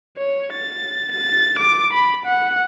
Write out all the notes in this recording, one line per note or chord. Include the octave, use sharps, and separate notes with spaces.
C#5
A6
A6
D6
B5
F#5